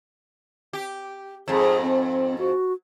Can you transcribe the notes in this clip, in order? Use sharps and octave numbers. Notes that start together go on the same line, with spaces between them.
G4
F2 G#2 G#4
C4
F#4